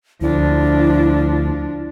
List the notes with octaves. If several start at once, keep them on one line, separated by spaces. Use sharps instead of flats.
D2 F3 D4 E4